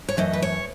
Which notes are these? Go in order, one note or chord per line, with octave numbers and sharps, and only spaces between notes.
C#5
F#2 E3 A3 D#5
B4
C#5